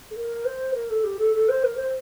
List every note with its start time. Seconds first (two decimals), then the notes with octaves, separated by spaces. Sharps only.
0.11 A4
0.15 A#4
0.45 C5
0.74 A#4
0.90 A4
1.04 G4
1.19 A4
1.34 A4
1.49 C5
1.64 A#4
1.76 C5